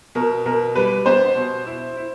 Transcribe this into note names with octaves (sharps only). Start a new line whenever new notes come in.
B2 A#4
B2 A#4
G3 B4
B3 C5
B2
E4
E4